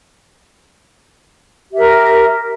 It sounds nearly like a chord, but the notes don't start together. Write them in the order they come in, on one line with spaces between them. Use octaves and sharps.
G4 E5 A#4